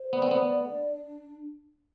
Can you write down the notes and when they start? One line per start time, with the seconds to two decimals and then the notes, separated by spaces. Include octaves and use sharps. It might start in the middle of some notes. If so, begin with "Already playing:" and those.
Already playing: C5
0.12 B3 D5
0.22 C4
0.31 B3
0.41 D5
0.70 D4